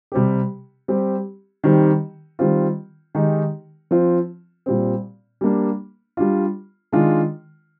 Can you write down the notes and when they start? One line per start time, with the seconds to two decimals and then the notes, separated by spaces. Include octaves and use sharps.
0.12 C3 G3 C4 G4
0.88 G3 C4 G4
1.64 D#3 G3 C4 D#4 G4
2.39 D#3 G3 C4 F4
3.15 D#3 G#3 D#4 G4
3.91 F3 C4 F4
4.66 A#2 G3 C4
5.41 G3 A#3 D4
6.17 G3 D4 F4
6.92 D#3 G#3 D4 F4